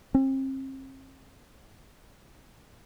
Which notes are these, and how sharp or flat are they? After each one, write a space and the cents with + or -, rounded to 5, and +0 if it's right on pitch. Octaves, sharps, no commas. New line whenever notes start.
C4 +40